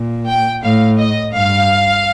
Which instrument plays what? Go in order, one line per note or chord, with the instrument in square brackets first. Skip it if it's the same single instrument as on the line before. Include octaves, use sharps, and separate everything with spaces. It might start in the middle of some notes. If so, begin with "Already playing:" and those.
Already playing: [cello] A#2
[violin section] G5
[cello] A2 [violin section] F5
[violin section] D#5
[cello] G2 [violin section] F5